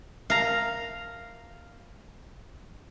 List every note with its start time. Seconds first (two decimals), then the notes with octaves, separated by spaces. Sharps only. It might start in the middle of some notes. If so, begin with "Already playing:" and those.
0.30 F5 A#5